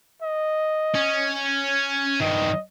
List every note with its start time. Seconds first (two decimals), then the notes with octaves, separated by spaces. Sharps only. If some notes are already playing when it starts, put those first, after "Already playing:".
0.22 D#5
0.95 C#4
2.21 G2 D#3 D#5